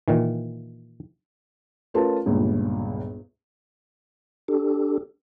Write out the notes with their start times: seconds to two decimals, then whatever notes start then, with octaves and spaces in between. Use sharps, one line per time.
0.08 A#2 D#3 E3
1.94 A3 C#4 F4 A#4 B4 A5
2.26 G1 C#2 A#2
4.48 D4 G4 A4